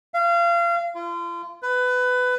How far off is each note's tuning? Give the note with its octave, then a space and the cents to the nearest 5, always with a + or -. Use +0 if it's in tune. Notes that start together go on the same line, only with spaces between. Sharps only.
F5 -30
F4 -35
B4 +20